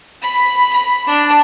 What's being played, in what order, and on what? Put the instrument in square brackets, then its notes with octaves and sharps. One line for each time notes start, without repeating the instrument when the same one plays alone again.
[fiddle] B5
B5
D4